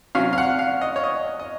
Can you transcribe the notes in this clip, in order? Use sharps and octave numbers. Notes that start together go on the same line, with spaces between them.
C3 F#3 C#4 F5
F5
F#5
F5
D#5
C#5
D#5
D#5